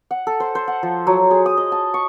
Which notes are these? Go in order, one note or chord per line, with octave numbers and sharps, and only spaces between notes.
F#5
A4
C5
C5
F#5
F3
F#3
G#4
D#6
D#5
A5
C#6